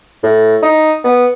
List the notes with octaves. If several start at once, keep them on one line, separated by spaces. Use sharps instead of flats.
A2
D#4
B3